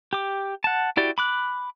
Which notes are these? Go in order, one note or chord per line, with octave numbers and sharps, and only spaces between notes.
G4 D6
F#5 A5
E4 F#4 G4 D5 G5
B5 D6 F#6